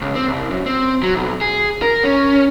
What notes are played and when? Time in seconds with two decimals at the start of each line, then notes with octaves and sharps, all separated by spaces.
0.02 C#2
0.16 C4
0.28 C2
0.50 F#2
0.66 C4
1.03 F#3
1.14 B1
1.41 G#4
1.82 A#4
2.04 C#4